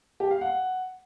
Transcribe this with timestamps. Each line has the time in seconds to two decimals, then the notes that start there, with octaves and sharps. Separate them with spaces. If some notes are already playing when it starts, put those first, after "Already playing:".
0.20 G4
0.31 F5
0.41 F#5